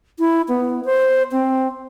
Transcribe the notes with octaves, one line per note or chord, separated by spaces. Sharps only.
E4
B3
C5
C4